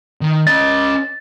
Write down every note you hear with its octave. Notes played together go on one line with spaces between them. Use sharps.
D#3
C#4 D#5 A6